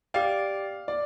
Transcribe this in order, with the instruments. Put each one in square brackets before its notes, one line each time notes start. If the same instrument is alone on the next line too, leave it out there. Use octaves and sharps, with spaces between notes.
[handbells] G4 D5 G5 [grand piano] F5
[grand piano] D5